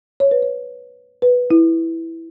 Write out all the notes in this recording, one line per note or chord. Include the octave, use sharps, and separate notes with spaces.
C#5
B4
C#5
B4
E4